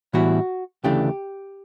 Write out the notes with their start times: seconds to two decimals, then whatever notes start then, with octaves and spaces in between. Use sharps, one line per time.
0.13 A2 E3 G3 B3 E4 F#4
0.84 D2 C#3 E3 A3 D4 G4